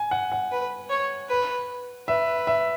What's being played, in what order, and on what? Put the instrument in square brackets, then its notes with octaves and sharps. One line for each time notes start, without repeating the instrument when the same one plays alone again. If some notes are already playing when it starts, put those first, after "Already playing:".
Already playing: [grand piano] G#5
F#5
F#5
[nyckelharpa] B4
C#5
B4
[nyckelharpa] B4 [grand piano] E5
[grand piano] E5